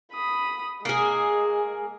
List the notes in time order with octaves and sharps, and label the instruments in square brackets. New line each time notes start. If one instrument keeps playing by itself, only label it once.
[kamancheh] B5 D#6
[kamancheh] G#3 [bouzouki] A#3 G#4